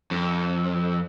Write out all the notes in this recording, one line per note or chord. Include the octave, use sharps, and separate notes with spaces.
F2